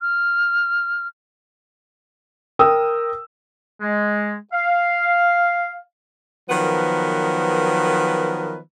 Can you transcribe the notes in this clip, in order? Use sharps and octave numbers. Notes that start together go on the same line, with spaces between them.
F6
A#4 G5 D#6 E6
G#3
F5
D#3 F3 F#3 B3 A#4 B4